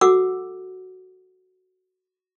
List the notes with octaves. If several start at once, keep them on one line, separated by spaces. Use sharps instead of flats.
F#4 A4 F#5 D6 E6